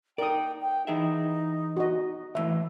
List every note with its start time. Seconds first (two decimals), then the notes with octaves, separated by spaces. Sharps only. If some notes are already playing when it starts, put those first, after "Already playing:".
0.18 D#4 A#4 D5 G5 D#6
0.61 G5
0.87 E3 D#4 G#4 E5
1.77 F#4 D#5
2.35 D2 A2 E3 E5